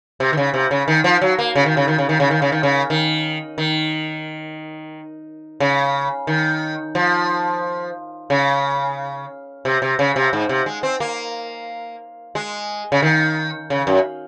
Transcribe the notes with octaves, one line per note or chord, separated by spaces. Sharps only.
C3
D#3
C#3
C3
C#3
D#3
F3
F#3
A#3
C#3
D#3
C#3
D#3
C#3
D#3
C#3
D#3
C#3
D#3
C#3
D#3
D#3
C#3
D#3
F3
C#3
C3
C3
C#3
C3
G#2
C3
G#3
C4
A#3
G#3
C#3
D#3
C#3
F#2